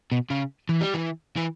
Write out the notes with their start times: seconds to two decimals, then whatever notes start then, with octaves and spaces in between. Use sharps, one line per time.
0.12 B2
0.30 C#3
0.69 E3
0.81 G3
0.94 E3
1.36 E3